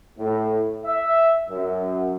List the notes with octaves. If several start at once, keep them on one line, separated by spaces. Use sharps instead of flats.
A2
E5
F#2